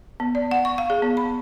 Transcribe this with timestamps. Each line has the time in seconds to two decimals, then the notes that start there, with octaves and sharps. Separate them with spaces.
0.20 B3
0.35 D5
0.51 F#5
0.65 C#6
0.78 F5
0.90 G#4
1.02 B3
1.17 B5